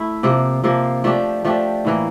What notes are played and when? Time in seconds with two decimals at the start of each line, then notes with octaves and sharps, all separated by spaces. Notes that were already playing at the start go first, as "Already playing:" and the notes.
Already playing: A3 E4
0.23 C3 F3 A#3
0.64 C3 F3 A#3
1.04 F3 A3 D4 G4
1.45 F3 A3 D4 G4
1.85 A2 E3 A#3